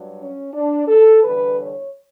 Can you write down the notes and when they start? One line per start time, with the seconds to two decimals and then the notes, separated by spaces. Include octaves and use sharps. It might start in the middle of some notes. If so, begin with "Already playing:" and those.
Already playing: G2 F#3
0.19 C#4
0.53 D4
0.88 A4
1.23 E2 D3 G3 B4
1.58 C#5